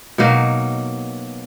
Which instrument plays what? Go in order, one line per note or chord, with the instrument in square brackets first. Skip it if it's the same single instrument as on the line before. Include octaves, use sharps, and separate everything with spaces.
[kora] B2 F#3 A#3 D#4